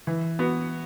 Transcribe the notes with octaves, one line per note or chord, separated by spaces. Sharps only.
E3
B3 F#4